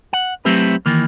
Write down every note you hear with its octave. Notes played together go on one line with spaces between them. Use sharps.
F#5
F#3 A3 C4 E4 G4 B4
D#3 E3 A#3